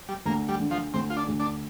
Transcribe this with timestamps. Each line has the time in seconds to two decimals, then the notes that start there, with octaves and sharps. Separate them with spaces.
0.09 G3
0.26 D2 A#3
0.49 G3
0.60 D3
0.71 F3
0.94 D2 C4
1.10 F4
1.17 D4
1.28 D2
1.40 D4